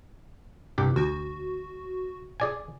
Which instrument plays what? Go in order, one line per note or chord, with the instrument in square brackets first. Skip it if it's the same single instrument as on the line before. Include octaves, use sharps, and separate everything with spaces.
[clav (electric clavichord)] C2 G2 G4
[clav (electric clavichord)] D2 [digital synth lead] F#4
[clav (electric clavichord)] G#4 D5 G#5